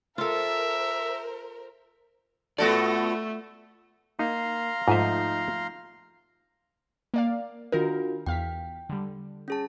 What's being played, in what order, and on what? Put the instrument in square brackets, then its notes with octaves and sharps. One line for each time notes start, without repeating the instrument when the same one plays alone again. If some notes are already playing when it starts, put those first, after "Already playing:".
[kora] F4 A4 [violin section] A#4 C5 [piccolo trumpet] E5
[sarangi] A3 [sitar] B3 F#4 A4 [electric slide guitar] F4 D5
[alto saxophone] A#3 [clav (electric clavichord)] D#4 [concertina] F5 A#5 C6
[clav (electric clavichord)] G#2 D#5 E5 [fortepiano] F3 A3 [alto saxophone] D#4
[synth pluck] A#3 D5 F5
[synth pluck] D#3 A#4 [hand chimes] D4 F4 F#4
[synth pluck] E2 F5 B6 [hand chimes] G5
[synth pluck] D3 G3
[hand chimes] C#4 G#4 A5